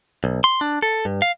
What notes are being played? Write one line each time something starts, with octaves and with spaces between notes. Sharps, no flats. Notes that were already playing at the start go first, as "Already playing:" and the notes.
B1
C6
D4
A4
G2
F5